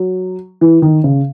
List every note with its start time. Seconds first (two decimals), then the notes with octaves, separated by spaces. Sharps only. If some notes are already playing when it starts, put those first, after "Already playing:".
Already playing: F#3
0.61 E3
0.82 D#3
1.04 C#3